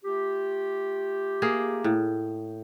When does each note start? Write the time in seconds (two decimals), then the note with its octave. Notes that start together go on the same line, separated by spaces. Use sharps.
0.05 A3 F4 G4
1.42 A#3 G#4
1.84 A2